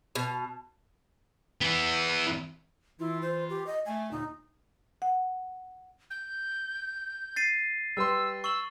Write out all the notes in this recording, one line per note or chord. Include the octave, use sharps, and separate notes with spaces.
B2
E3 B3
E3 E4 F4
C5
G4
D#5
A3 G#5
D#2 A#2 D3 D#4
F#5
G6
A6 C7 D#7
G3 B4 C6 E6
C#6 E6 F#7